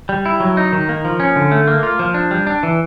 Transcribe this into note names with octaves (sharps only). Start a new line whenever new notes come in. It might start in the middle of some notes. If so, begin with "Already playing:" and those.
G3
E4
F#3
D#4
D#3
A#3
F3
C#4
D3
A3
A#3
F4
F3
D4
G3
D4
E3